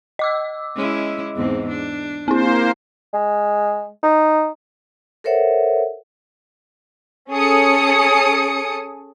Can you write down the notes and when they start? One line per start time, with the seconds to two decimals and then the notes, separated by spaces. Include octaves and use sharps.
0.19 D#5 D6 E6
0.75 G#3 C#4 E4
1.35 E2 G#2 C4
1.69 D4
2.28 A#3 C4 E4 C5
3.13 G#3
4.03 D#4
5.24 A4 A#4 C5 C#5 E5 F#5
7.31 C#4 G#4 A4 D#6 C#7